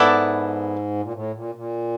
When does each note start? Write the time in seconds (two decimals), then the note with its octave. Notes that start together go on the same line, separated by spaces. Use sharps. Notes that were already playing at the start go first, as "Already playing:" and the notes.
Already playing: G#2 B3 E4 A4 D5
1.02 A#2
1.13 A2
1.34 A#2
1.55 A#2